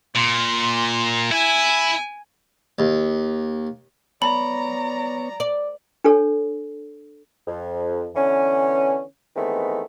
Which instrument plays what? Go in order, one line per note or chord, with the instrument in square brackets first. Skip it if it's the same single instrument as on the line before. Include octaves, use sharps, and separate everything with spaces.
[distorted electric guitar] A#2 [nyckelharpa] C6
[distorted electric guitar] E4 [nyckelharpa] G#5
[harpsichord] D#2
[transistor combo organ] B3 C#5 [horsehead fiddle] D5 A#5 [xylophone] B5
[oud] D5
[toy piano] D4 A4 C#5
[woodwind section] F2
D3 E3 B3 C#4
D#3 E3 G#3 A3 B3 C4